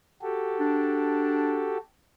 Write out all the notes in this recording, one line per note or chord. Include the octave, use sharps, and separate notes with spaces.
F#4 G4 A4
D4